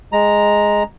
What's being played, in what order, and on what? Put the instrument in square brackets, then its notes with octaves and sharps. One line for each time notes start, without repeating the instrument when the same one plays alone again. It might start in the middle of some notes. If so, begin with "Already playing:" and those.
[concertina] G#3 A#5